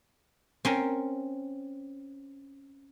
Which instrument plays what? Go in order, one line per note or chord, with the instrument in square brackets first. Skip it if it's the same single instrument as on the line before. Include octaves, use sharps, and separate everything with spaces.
[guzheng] C4 C#4 A#4